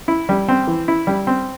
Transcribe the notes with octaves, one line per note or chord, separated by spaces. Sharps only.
E4
G3
C4
E3
E4
G3
C4